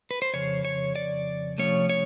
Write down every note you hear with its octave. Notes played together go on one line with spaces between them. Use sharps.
B4
C5
F2 C#3 C#5
C#5
D5
C3 F3 A3 C#4 C#5
C#5